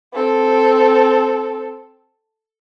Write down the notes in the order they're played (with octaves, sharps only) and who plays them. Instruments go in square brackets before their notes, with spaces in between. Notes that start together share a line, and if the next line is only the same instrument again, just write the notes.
[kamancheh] C4 A4